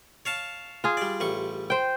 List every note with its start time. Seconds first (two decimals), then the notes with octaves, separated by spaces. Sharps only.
0.25 C#5 F5 A5
0.84 F4 G#4
0.97 G3 D5
1.20 A1 G3 C#6
1.70 C5 G5